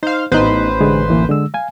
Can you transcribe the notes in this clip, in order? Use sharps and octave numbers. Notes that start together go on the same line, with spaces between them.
D#4 C5 F5
A1 B3 D#4 B4 C5
D3 G#3 G#4
D2 E3 A#3
D3 G#3 E6
F5 G#5